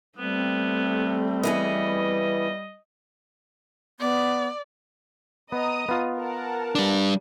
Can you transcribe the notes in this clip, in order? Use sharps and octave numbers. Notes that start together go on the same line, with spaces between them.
G3 A3 B3 C4
E3 B3 G#4 D#5
B3 D5
B3 D#5 A#5 D#6
B3 F4
A#4 F#5 A5
G3 D4